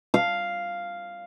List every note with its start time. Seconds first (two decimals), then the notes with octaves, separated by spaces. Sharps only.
0.14 F5